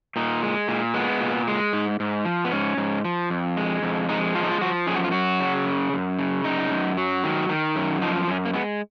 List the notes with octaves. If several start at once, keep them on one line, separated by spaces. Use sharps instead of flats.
A#2 D#4
G#3
A#2
G#3 B3
A#2
G#3
G#2
G#2
F3
B3
G#2 C#4
G#2
F3
F2
G#3
F2
G#3 D#4
F3 F4
D#4
F4
F3 F#4
F#2 G#4
F#4
F4
F#3 F#4
C#3
F#2
F#2
C#3
F#2 D#4
F#2
F#3
D#3
D#3
F#2
F3 D#4
F#2 C#4
A#3
G#3 B3